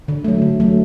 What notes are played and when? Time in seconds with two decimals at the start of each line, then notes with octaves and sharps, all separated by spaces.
0.08 D3
0.24 F#3 A3
0.42 D3
0.60 F#3 A3